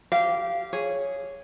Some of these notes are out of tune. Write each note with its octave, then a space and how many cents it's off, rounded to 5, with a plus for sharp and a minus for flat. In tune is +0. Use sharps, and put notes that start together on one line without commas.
G4 -15 F5 -20
G#4 +0 C#5 +0